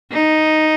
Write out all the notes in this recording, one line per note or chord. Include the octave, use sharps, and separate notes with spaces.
D#4